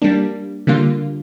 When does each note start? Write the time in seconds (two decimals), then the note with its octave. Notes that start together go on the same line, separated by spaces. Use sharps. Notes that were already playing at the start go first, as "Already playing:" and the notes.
0.02 G3 A#3 D4
0.67 D3 G3 A#3 F4